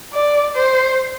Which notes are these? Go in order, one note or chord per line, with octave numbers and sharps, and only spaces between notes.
D5
C5